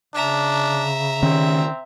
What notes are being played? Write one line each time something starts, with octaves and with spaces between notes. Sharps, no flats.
C#3 D4 E5 A#5
D#3 C4 C#4